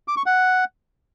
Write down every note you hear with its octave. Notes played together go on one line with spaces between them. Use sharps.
D6
C#6
F#5